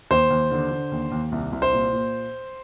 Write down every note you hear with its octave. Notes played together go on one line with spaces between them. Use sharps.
D#2 C5
D#2
D3
D3
D#2
D#2
C2
C2
C5
A#2
A#2